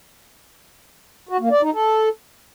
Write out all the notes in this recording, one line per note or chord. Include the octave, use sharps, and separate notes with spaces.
F#4
A#3
D5
D#4
A4